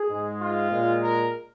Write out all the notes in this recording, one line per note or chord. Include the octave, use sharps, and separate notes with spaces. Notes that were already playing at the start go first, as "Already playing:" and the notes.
Already playing: G#4
G#2 G#3
F4
A#2 G#3
A#4